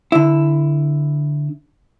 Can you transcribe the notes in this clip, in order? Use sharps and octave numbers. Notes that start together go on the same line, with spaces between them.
D3 E4